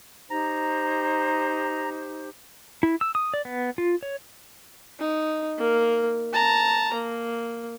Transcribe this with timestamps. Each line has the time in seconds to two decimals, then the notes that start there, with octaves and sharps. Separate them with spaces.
0.30 D#4 G4 C5 A#5
2.83 E4
3.01 E6
3.15 D#6
3.34 D5
3.45 B3
3.78 F4
4.03 C#5
4.99 D#4
5.58 A#3 A#4
6.33 A5 A#5
6.94 A#3